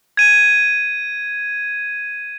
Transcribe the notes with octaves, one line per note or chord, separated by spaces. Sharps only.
G#6 D#7